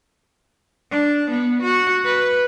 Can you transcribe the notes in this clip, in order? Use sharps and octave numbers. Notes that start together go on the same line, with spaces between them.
D4
B3
F#4
B4